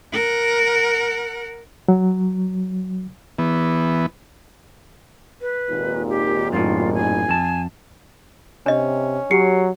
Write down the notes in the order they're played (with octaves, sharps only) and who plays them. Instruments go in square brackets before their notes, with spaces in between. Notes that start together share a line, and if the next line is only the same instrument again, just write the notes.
[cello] A#4 F#5
[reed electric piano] F#3
[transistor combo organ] E3 B3
[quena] B4
[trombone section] G#1 D#2 A#2
[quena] G4
[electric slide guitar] F#2 A2 [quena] F4
[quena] G#5
[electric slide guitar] F2 A5
[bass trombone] C3 [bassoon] C#4 [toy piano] D4 D#5
[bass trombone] F#3 [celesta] G4 C7 C#7